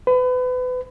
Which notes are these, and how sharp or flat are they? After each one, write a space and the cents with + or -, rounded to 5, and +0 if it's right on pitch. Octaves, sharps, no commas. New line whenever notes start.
B4 +30